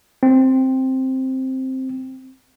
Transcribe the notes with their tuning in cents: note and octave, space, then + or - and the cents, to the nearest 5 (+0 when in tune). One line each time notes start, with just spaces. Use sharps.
C4 +5